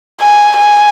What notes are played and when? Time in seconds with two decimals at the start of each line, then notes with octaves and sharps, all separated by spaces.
0.21 G#5
0.57 G#5